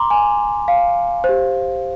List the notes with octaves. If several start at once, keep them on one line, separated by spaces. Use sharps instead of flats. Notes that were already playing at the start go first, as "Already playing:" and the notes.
Already playing: A#5 C6 D6
G#5
F5
C5
G4